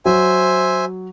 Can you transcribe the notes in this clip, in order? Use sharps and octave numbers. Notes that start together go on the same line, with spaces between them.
F#3 C5 E5 G#5